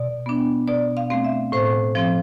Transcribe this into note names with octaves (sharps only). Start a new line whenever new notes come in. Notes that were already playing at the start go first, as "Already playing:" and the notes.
Already playing: B2 D5
B3 D4
B2 D5
F5
A3 C4
E5
A2 C5
F3 C4